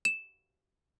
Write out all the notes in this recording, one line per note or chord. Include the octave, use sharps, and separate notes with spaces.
E7